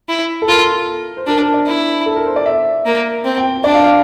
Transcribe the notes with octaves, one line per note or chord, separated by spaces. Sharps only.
E4
A4
F4 A#4
C5
D4 A#4
A#4
D5
E4
A4
A#4
C5
D5
E5
A#3
C4
G5
D4 D5
F5
F5